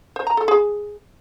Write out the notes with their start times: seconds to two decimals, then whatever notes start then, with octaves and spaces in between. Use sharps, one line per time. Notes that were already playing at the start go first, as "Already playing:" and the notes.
0.16 C5
0.27 A#5
0.37 A4
0.48 G#4